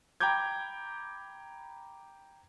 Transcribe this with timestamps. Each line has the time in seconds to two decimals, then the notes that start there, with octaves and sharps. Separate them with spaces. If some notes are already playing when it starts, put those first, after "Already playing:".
0.20 G5 A#5 B5 D6 G6 G#6